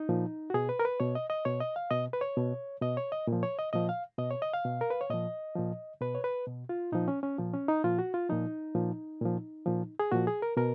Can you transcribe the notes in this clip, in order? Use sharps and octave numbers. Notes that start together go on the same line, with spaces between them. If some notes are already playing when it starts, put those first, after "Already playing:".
Already playing: D#4
A#2 F3
F#4
B2 G#4
B4
A#4
B4
B2 C#5
D#5
D#5
B2 C#5
D#5
F5
B2 D#5
B4
C#5
B2
B2 D#5
C#5
D#5
A#2
F3
C#5
D#5
A#2 F3 D#5
F5
B2 D#5
C#5
D#5
F5
B2
A#4
B4
C#5
A#2 F3 D#5
A#2 F3
B2 B4
C#5
B4
B2
F4
A#2 F3 D#4
C#4
C#4
A#2 F3
C#4
D#4
A#2 F3 F4
F#4
F4
A#2 F3 D#4
A#2 F3
A#2 F3
A#2 F3
G#4
A#2 F3 F#4
G#4
A#4
B2 A#4